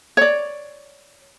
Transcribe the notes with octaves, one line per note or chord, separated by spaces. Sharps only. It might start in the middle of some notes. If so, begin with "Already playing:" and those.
C#5 D5